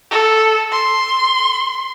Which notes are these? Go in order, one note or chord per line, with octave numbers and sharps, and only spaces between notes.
A4
C6